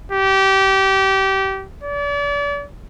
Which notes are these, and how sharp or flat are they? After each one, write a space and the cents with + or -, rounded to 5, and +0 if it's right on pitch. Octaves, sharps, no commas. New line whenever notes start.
G4 -25
D5 -40